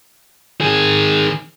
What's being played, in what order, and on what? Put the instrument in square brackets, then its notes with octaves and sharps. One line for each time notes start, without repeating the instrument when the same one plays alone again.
[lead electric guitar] D#3 G#4